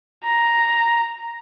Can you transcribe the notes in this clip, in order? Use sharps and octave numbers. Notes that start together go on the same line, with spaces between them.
A#5